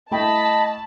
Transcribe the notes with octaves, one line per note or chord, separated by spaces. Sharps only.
A3 E4 D#5 G5 A5 B5